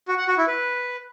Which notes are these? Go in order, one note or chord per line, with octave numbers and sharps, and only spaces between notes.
F#4
F#5
F#4
E4
B4